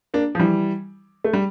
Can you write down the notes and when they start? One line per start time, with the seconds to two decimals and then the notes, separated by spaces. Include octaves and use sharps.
0.14 A#3 D4
0.35 F3
0.39 E3 G3
1.24 A3
1.33 G3